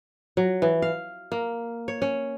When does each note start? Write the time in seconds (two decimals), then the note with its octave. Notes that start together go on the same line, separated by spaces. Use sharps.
0.37 F#3
0.62 E3
0.82 F5
1.32 A#3
1.88 C#5
2.02 C#4